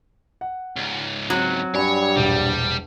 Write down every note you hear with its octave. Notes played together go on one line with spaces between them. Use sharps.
F#5
C#2 G#2
F#3 C4 D#7
G2 C#5 D5 G#5 B5
E1 A#1 G3